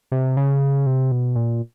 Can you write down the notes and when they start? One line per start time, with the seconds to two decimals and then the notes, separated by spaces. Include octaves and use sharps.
0.12 C3
0.37 C#3
0.86 C3
1.12 B2
1.36 A#2